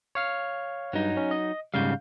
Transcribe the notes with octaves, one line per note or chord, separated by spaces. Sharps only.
C#5 F5 F6
G2 F#3 D#4
C#4
D#5
G#2 C#3 G3 F5 G6